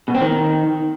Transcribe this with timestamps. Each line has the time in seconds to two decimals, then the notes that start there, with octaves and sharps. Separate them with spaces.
0.08 B2
0.15 C4
0.21 D#3